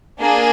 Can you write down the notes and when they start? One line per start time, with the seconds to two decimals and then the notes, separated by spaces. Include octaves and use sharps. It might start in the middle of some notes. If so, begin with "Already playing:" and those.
0.21 A#3 D4 G#4